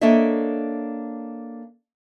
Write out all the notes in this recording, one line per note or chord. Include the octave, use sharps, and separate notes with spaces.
A#3 D4 A4 C#5 D#5 E5